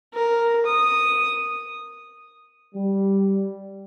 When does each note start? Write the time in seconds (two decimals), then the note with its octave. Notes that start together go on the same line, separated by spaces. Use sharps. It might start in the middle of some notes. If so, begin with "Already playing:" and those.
0.14 A#4
0.66 D#6
2.75 G3